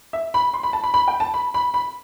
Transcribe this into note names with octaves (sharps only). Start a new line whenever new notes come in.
E5
B5
C6
B5
A5
B5
B5
G5
A5
B5
B5
B5